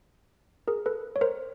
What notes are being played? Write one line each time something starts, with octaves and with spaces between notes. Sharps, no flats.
G#4 A#4
A4 B4
C#5
A#4 C5